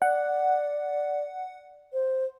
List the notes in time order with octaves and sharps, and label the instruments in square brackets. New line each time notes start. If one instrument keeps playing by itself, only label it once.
[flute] D5 [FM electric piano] F#5
[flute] C5